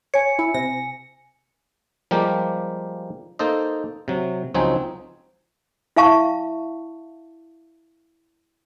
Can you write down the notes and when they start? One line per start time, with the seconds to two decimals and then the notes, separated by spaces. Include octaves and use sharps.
0.14 C#5 G#5 C#7
0.39 E4
0.54 C3 A#6
2.11 F3 G3 G#3 A#3 G4 A#4
3.39 A#3 D#4 A4 C5 D#5
4.08 C3 F#3
4.54 C#2 F3 F#3 C4 D#4 G#5
5.96 E4 E5 F5 A5 C#6